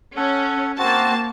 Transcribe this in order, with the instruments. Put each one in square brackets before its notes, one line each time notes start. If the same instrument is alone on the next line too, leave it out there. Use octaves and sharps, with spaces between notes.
[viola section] C#4 [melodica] A4 F#5
[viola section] A#3 A5 [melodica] C4 F#4